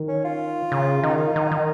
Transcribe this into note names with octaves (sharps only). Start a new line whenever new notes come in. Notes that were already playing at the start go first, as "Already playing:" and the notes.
Already playing: D#3
C#4
F4
C#3
D#3 D#4
F4
D#4
D#3
D#3